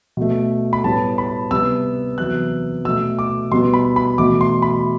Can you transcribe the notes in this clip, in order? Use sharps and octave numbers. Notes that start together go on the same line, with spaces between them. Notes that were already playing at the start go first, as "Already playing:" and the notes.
B2 A3
B5
A2 G3 B3 A5
B5
C3 G3 B3 E6
E2 C3 F#3 B3 F#6
B2 A3 E6
D6
B2 G3 B3 C6
B5
B5
E2 B2 A3 D6
C6
B5